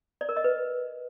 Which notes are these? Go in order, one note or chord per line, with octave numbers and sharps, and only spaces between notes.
D5
A#4
D#5
B4